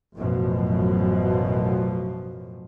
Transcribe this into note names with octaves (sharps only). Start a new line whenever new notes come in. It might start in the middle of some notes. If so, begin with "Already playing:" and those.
A1 F#2 B2 F3